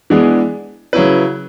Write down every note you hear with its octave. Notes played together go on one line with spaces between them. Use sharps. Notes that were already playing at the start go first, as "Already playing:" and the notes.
E3 G#3 B3 D4 G#4
C#3 F#3 C#4 E4 B4